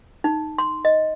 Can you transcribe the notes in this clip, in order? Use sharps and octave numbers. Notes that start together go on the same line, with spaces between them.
D#4
C6
D#5